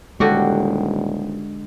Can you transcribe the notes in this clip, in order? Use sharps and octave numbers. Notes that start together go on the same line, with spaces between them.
D#1 D3 G#3 F#4 G4